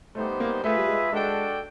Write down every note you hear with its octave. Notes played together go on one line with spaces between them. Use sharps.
G3 A3 B3 D#4 G4 C5
A#3
A3 F4 G#4 B4 E5
G3
G#3
G#3 D4 F#4 A4 D5 G5